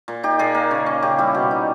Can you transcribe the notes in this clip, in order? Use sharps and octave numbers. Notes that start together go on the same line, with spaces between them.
A#2
D#4 G4
A#2 G#4
A#3
C#3
C#4
C#3 G4
G3 E4
B2
D#4